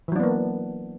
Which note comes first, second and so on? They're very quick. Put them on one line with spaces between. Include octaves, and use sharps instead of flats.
E3 F#3 D4 B3 A#3